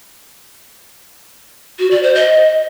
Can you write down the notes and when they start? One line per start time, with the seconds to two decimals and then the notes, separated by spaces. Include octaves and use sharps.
1.79 F#4
1.91 D5
2.03 C5
2.15 D#5